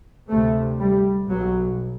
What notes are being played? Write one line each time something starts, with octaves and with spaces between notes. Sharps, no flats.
D2 C3 A3
G3
B1 B2 F#3